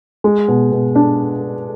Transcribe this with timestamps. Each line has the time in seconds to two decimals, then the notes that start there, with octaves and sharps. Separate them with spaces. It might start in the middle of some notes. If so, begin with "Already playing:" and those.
0.24 G#3
0.48 B2
0.72 B2
0.95 D4